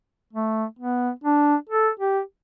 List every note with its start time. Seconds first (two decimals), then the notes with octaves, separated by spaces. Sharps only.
0.33 A3
0.79 B3
1.24 D4
1.69 A4
2.00 G4